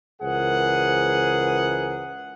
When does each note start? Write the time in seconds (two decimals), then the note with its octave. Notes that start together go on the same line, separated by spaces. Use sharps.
0.22 C#2 E3 G#4 A#4 C5 F#5